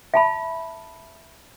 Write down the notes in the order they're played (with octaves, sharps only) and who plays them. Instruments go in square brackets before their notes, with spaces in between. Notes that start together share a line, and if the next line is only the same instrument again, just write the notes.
[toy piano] E5 A5 B5